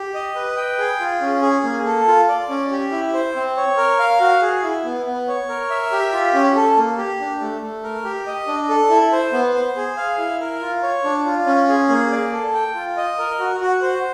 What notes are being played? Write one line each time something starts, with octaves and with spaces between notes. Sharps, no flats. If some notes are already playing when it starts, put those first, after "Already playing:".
Already playing: G4
D#5
B4
G5
G#4
F4
C#4
G#4
A#3
A4
F4
D5
C#4
G4
E4
C5
C4
C#5
A#4
F5
F#4
G#4
E4
B3
B3
C#5
A#4
E5
G4
F4
C#4
A4
A#3
G4
D4
A3
A3
A#4
G4
D#5
D4
A4
E4
C5
B3
C5
G#4
F5
E4
A#4
F4
C#5
D4
F4
C#4
G#4
A#3
D5
A4
G5
F4
D#5
A#4
F#4
F#4
C5